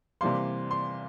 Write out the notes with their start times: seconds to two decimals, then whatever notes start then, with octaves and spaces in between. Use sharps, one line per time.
0.21 C3 E3 G3 A#3 C6
0.71 C6